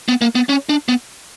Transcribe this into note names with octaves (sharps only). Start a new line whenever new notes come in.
B3
A#3
B3
C#4
D4
B3